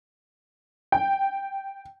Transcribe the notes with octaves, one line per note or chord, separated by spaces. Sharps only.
G5